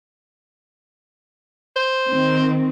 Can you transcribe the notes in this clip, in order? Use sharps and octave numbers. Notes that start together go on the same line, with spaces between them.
C5
D#3 C4